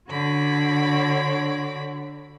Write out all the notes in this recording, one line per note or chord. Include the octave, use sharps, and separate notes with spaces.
D3 D4 F#4 C#5 B5 D6